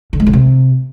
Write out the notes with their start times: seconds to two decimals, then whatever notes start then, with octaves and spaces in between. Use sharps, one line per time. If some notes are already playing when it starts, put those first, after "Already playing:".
0.13 D3
0.20 G#3
0.27 D3
0.33 C3